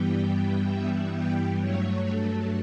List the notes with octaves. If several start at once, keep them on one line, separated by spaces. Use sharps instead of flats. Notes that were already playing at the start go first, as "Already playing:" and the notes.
Already playing: G2 E3 G3 B3 G5
E5
G5
G2 F#3 A3 C#5
A4